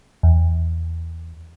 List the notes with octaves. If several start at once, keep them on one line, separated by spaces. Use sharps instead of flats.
E2